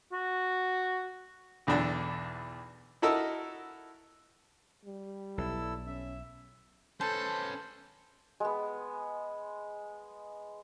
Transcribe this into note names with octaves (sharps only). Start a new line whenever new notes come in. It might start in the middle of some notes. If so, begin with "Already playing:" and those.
F#4
B1 E2 D3 D4 A4 E6
E4 F#4 A4 A#4 D#5 E6
G3
B1 E4 A4 E6
C#4 E5
C#4 A4 B4 C5 A5
G#3 B3